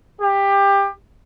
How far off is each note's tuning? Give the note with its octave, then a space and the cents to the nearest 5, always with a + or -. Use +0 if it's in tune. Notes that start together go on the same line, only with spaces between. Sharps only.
G4 +20